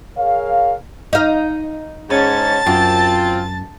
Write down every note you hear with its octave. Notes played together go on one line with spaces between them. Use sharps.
G#4 A#4 C#5 F5
D#4 F5
G#2 C#4 A5 A6
F#2 C4 F4